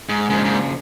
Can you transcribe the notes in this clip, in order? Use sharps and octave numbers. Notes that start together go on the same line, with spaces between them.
G#2
G#2 C#3 F3 A#3 D4
G#2